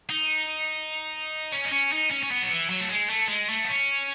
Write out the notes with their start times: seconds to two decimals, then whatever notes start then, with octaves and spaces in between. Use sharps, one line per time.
0.10 D#4
1.52 C#4
1.65 D#4
1.72 C#4
1.92 D#4
2.10 C#4
2.23 C#4
2.31 B3
2.42 F#3
2.50 E3
2.70 F#3
2.81 A3
2.90 G#3
3.10 A3
3.29 G#3
3.49 A3
3.64 B3
3.69 C#4